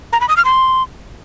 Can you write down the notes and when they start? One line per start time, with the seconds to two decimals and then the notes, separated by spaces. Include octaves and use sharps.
0.13 A#5
0.21 B5
0.29 D#6
0.37 F6
0.45 C6